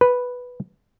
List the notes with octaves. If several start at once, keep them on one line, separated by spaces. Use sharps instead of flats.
B4